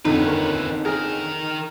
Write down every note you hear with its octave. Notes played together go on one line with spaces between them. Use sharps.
G1 F2 D3 D#3 D#4 B4
A#4
D#3 G#4 A#4